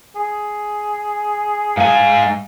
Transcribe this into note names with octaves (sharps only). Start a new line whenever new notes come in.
G#4
G#2 F5 G#5